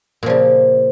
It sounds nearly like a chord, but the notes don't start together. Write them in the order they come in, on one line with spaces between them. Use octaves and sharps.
A#2 F3 C#3